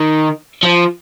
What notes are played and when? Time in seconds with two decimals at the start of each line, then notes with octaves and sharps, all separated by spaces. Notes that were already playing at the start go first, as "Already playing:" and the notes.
Already playing: D#3
0.63 F3